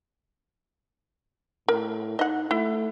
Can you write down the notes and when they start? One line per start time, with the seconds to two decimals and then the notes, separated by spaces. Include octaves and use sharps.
1.68 A2 A#4
2.19 D#4 D#5 F#5
2.51 A3 E4